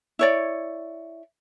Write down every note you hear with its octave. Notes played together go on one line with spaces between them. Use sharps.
E4 C#5 D5